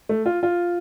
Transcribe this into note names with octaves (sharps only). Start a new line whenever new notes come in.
A3
F4
F4